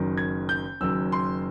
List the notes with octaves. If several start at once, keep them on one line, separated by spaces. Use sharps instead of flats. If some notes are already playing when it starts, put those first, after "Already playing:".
Already playing: F#1 F#2 D#3
G#6
G6
F#1 F#2 D#3 E6
C6